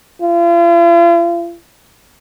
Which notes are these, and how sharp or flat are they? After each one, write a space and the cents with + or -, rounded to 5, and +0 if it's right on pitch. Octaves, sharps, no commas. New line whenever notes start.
F4 -45